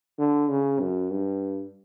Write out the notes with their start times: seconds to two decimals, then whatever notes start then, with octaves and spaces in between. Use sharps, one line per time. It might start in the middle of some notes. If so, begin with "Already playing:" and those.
0.19 D3
0.50 C#3
0.81 F#2
1.11 G2